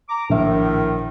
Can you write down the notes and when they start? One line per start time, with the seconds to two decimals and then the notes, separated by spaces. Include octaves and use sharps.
0.09 A#5 D6
0.30 A#1 A2 D#3 E5